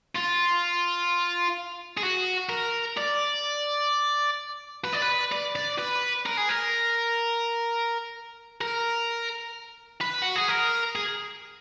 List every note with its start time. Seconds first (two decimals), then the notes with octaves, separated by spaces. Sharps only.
0.15 F4
1.98 G#4
2.03 F#4
2.49 A#4
2.97 D5
4.85 B4
4.93 D5
5.02 B4
5.32 D5
5.56 D5
5.79 B4
6.26 A#4
6.37 G#4
6.49 A#4
8.61 A#4
10.01 B4
10.22 F#4
10.35 G#4
10.48 A#4
10.96 G#4